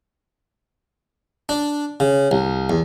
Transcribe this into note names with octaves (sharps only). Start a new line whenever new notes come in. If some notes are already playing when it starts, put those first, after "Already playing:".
D4
C#3
C2
E2